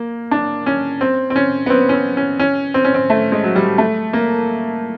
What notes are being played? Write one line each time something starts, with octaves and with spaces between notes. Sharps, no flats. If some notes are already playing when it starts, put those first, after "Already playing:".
Already playing: A#3
D4
C#4
C4
C4
C#4
B3
C4
C#4
C4
C#4
C#4
C4
C#4
C4
A3
G#3
F#3
G3
A3
A#3